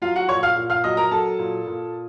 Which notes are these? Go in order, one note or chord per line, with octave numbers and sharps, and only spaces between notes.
F#3 F4 F5
F#4 F#5
A#2 C#5 C#6
F5 F6
A#2
F5 F6
F#3 D#5 D#6
A#4 A#5
F#3 A4 A5
A#2
A#2